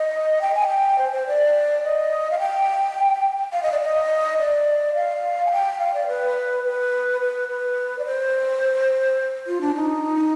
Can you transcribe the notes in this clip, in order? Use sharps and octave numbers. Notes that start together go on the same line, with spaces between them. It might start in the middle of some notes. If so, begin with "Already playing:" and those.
Already playing: D#5
G5
G#5
G5
C5
C5
D5
D#5
F5
G5
F5
D#5
D5
D#5
D5
F5
G#5
G5
F5
D5
B4
B4
B4
B4
D5
C5
F4
D4
D#4